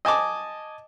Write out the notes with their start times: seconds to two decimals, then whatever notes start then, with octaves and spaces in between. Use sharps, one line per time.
0.05 D#5 G#5 A5 D6